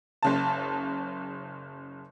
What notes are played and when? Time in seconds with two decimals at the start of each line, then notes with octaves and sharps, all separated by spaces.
0.23 F#1 C#3 A5